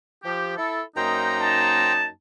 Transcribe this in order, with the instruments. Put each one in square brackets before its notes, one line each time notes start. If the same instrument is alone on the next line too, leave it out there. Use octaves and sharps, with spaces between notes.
[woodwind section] F3 G4
E4 A4
[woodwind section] F#2 A#3 D#4 [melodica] C5 G5 A#5
[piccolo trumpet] A5